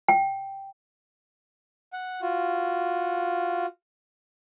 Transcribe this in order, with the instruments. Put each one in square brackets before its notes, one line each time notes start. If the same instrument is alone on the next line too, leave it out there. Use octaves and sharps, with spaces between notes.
[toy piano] G5
[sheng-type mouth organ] F#5
F4 F#4